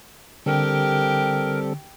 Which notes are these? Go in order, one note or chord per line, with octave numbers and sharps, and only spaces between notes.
D3 G3 C4 G4 A4 A#4 G5